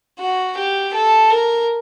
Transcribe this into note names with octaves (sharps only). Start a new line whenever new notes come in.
F#4
G4
A4
A#4